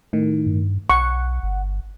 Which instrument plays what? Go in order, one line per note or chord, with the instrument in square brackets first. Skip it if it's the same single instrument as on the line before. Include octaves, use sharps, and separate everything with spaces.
[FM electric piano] A2 D#3
[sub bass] G2
[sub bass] B1 [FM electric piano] F#5 [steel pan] C#6
[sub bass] G1